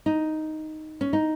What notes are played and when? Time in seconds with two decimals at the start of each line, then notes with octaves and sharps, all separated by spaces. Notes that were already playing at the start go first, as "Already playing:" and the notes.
0.06 D#4
1.01 C#4
1.13 D#4